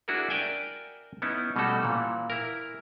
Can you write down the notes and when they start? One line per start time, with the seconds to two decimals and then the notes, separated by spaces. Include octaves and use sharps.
0.08 D4 E4 F#4 G#4 A#4
0.30 A#4 D5 E5 G5 G#5
1.22 B3 C#4 D#4 E4
1.56 B2 G3 A3 C#4 F#4 A4
1.83 A#2 E3
2.30 E4 A#4